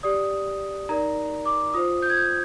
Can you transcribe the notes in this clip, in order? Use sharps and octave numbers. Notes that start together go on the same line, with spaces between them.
G4 D5 D#6
D#4 A#4 D5 A#5
D6
F4 C5 D#6
G6
G#6
G6